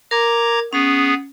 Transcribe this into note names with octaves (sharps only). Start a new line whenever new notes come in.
A#4 A#5 D6 G#6
B3 C#4 G#4